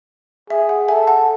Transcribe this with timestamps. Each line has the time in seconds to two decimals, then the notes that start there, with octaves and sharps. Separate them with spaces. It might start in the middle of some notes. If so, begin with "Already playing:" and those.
0.50 G#4 E5
0.69 F#5
0.88 A4 E5 G#5
1.07 F#5 A5